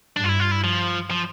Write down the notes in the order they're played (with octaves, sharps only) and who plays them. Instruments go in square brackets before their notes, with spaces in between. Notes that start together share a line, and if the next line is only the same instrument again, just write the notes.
[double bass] G2 [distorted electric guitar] D4
[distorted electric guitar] F4
E4
F4
E4
F3
F3